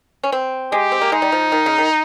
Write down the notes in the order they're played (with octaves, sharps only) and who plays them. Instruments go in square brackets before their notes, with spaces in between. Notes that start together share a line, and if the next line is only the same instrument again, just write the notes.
[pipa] C#4
C4
[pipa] G#3 [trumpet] G4
[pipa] C4
A#3
[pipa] G#3 [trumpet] D#4
[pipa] G3
F3
D#3
C#3
D#3